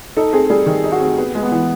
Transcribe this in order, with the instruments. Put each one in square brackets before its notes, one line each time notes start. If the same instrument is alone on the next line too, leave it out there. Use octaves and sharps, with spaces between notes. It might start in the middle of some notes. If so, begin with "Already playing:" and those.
[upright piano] D#4 [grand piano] A4
[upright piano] C4 [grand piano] G#4
[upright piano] G3 [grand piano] G#4
[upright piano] D#3
D#4
[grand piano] F#4
[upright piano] C4
B3
G#3
[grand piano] B3
[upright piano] E3